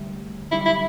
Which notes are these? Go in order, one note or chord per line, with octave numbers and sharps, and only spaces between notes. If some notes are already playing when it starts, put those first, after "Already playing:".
Already playing: D2 D3 G3 E4
F#2 D3 G3 E4
E4